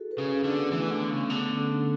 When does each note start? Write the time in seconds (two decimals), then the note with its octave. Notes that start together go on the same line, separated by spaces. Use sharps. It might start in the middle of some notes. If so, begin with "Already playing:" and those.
Already playing: E4 F#4 G#4 A4
0.11 G#4 B4
0.18 C#3
0.31 C#4
0.44 D3
0.50 B3
0.71 E3 A3
0.91 D3
0.97 B3
1.10 C#3
1.24 B3
1.30 D3
1.50 C#4
1.70 D4